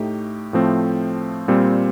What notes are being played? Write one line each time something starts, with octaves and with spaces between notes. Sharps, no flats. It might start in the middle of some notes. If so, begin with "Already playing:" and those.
Already playing: A2 A3 D#4 G4
A2 F3 A3 C4
A#2 G3 C4